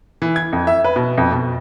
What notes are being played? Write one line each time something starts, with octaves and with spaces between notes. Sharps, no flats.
E3
G#6
F2
E5
B4
B2
F2
B2